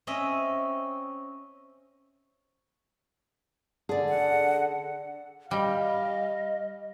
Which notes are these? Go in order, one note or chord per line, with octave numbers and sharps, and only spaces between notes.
C4 C#4 D#5 E5
D3 G#4 D5
F#5
G3 D#5 F5